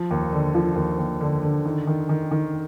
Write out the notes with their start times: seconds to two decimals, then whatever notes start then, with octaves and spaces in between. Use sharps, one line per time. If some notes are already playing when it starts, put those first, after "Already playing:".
Already playing: F3
0.11 D#2
0.33 D3
0.54 F3
0.76 D#2
0.99 D#2
1.21 D3
1.43 D3
1.65 D#3
1.87 D#3
2.09 D#3
2.31 D#3